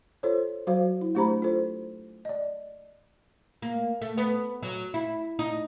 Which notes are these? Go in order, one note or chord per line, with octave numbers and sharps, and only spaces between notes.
F4 A4 C5 C#5
F#3 F#4 C5 F5
E4
A3 D4 G4 C5 A#5 B5
F4 A4 C5
D5 D#5
A#3
A3
B3
F#3
E4
D#4